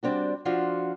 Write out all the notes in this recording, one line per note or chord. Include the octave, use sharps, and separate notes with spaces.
G3 C4 D4 F#4
F3 D4 F4 F#4